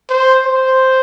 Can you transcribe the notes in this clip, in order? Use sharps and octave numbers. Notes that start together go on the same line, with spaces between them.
C5
C5